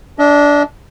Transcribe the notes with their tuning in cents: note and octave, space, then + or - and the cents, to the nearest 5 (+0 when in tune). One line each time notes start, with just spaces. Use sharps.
D4 -15 D#5 +35